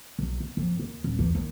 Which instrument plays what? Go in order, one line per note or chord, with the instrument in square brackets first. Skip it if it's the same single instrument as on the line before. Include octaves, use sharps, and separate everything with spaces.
[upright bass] B1
B2
F2
D#2
D#1
E2
D#2